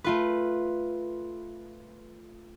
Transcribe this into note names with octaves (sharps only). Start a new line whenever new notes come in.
A3 F4 B4